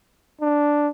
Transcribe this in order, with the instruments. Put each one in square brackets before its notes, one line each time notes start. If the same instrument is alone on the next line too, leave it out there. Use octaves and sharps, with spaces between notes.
[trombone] D4